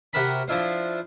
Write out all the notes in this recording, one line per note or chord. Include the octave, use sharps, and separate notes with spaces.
C3 F#4 A#4 A5 B5
F3 D4 E4 F4 C5